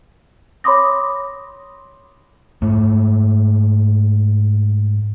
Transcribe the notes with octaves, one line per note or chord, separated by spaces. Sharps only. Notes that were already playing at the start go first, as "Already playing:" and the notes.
C#5 B5 C6 D6 D#6 A#6
G#2 A3